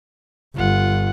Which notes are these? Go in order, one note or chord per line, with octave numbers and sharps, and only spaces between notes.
G1 F4 F#5